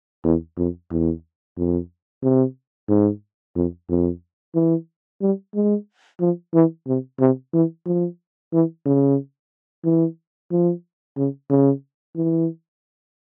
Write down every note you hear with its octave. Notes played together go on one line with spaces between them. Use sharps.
E2
F2
E2
F2
C3
G#2
F2
F2
E3
G3
G#3
F3
E3
C3
C3
E3
F3
E3
C#3
E3
F3
C#3
C#3
E3